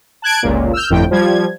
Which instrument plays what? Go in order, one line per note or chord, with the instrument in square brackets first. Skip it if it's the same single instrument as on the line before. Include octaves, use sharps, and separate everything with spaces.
[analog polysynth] A5 F#6 G#6 D7
G1 C#2 A#2
E6 F6 G6
G1 F2 A2 G5
F3 G3 G#6